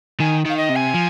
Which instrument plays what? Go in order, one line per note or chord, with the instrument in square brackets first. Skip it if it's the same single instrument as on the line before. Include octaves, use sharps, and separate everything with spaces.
[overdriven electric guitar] D#3 [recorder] G#5
[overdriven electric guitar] D#3 [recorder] F5
[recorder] D#5
[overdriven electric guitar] C3
[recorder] G#5
[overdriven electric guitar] F3